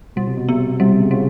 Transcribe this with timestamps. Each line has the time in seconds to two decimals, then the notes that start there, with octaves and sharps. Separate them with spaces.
0.16 B2 G3
0.27 C3
0.37 B2
0.48 C3 B3
0.80 C3 G3
1.00 C#3
1.11 C#3 G3